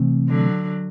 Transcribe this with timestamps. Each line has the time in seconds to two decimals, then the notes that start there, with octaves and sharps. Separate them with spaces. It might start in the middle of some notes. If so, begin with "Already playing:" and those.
Already playing: C3 E3 A3 C4
0.28 D3 F#3